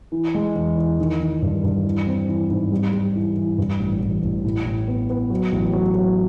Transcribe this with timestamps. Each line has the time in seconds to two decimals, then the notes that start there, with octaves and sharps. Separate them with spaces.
0.12 E3
0.34 G#3
0.55 E2
0.77 E3
0.99 D#3
1.20 D#3
1.42 G2
1.64 G2
1.84 E3
2.07 C4
2.28 E3
2.50 G#2
2.72 G3
2.93 G3
3.15 E3
3.36 E3
3.58 G2
3.80 A1
4.01 A1
4.23 A1
4.45 A2
4.65 A2
4.88 B3
5.10 B3
5.30 F#3
5.52 A1
5.73 F#3
5.95 F#3